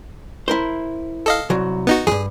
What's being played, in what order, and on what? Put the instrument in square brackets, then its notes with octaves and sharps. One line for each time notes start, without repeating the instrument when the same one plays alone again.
[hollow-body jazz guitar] E4 A#4 C5
[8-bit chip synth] A4 D#5 F5
[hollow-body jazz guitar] C2 F#3
[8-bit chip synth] B3 D#4 F#4
[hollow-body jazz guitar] E2 G2 [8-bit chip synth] G#4